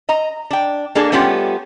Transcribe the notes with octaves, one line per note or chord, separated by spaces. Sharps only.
D#5 A#5
D4 G5
A#3 D4 G#4 A4
G3 A3 B3 C#4 F4 G4